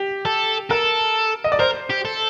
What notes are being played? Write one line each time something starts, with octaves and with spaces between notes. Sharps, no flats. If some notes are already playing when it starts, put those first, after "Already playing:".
Already playing: G4
A4
A4 A#4
D#5
D5
A#4 C5
G4
A4